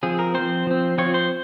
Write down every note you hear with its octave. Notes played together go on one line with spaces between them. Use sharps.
F3 C4 G#4
A#4
F3 C4 C5
F3 C4
F3 C4 C#5
C5